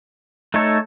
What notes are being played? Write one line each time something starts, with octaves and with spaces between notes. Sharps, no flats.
A3 D#4 A4 C#5